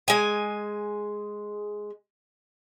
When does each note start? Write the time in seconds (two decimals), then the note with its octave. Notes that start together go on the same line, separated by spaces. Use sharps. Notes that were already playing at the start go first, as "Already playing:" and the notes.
0.08 G#3 G#5